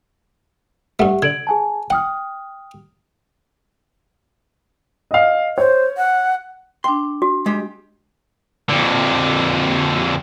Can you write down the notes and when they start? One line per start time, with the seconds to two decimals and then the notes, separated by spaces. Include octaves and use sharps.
0.99 G2 A3 G4 E5 F#5
1.22 D3 G#6 D7 F#7
1.47 G#4 G#5 A5
1.90 F#5 G5 D#6 F6
5.11 D#5 F5
5.58 C5 C#5
5.97 F#5
6.84 D4 G5 C6
7.22 F#4
7.46 G#3 G4
8.70 F2 D3